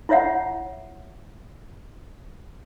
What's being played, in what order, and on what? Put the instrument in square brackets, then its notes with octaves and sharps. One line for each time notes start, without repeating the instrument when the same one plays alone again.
[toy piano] E4 F4 C#5 E5 F#5